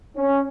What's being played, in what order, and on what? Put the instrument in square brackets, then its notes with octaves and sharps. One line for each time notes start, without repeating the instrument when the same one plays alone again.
[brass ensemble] C#4